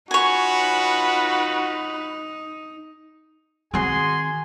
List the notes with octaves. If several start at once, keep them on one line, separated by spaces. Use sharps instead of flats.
D#4 F4 F#4 B4 C#5 G#5
D#3 C4 F#4 G#4 G#5 C6